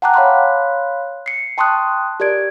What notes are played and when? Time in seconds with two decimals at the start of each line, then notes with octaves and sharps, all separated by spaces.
0.02 F#5 G5 A5 A#5 D6 F#6
0.14 C#5 F5 B5 C6 F#6
1.26 C7 C#7
1.58 G5 A5 C6 C#6 D#6 F#6
2.20 G4 A#4 D5 G#6 D7